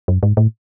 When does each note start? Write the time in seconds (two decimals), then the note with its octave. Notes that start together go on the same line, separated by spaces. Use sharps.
0.08 F#2
0.23 G#2
0.37 A2